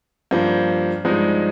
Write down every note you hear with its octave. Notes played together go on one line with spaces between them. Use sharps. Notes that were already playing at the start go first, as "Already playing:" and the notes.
G2 F3 A#3
G2 F3 G#3 D#4